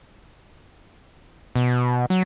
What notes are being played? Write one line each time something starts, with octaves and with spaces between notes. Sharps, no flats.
B2
F#3